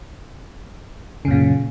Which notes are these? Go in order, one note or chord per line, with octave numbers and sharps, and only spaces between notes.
F#2 A#2 C#3